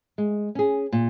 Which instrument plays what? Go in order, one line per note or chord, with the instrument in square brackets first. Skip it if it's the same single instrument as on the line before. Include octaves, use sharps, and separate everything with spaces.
[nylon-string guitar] G#3
C#4 G#4
A#2